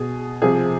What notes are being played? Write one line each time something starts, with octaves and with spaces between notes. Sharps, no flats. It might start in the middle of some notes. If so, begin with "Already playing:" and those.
Already playing: B2 G#4
C3 F3 G#4